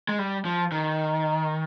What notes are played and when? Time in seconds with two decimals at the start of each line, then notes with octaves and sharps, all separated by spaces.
0.09 G#3
0.19 G3
0.45 F3
0.72 D#3